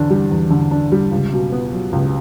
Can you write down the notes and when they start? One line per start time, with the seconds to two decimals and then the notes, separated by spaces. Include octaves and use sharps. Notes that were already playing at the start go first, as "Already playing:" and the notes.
Already playing: E2 D3 D4
0.10 G3
0.31 E2
0.50 D3
0.71 D4
0.92 G3
1.11 C#2
1.32 B2
1.52 B3
1.72 F#3
1.92 C#2